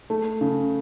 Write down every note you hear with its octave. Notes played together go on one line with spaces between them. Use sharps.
A3
C#3